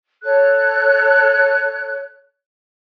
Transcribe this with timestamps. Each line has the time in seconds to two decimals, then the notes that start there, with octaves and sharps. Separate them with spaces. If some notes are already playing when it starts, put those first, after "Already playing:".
0.24 A4 C#5 F#6